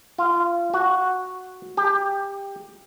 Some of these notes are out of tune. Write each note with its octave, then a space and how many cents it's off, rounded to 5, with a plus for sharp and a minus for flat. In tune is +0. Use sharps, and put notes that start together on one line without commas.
F4 -20
F#4 -5
G4 +15